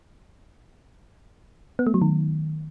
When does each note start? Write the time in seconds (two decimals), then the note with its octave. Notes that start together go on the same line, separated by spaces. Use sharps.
1.79 B3
1.87 A3
1.94 F#3
2.02 D#3